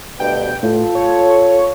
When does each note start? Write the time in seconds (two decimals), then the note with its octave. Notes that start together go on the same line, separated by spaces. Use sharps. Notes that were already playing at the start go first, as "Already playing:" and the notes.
0.20 D2 G2 B2 G5
0.63 A2 F4 A4
0.95 C#5